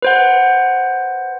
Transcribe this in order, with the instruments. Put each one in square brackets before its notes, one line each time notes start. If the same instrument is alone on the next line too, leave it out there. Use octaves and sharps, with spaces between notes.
[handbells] B4 C5 F#5